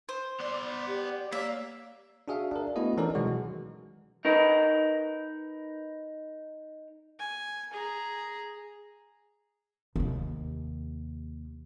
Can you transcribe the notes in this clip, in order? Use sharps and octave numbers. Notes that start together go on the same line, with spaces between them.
C5
B3 D5 C6
G4
A#3 C#5 E5
D4 F#4 G#4 E5 F5
D4 A#4
A3 B3 E4 F#4 D#5
E3 C#4 D#4 A4 A#4 D5
B2 D#3 E3 F#3 G#3 F#4
D#4 A#4 B4
G#5
G#4 A#5
D#2 C3